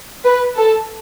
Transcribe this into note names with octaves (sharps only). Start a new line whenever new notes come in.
B4
A4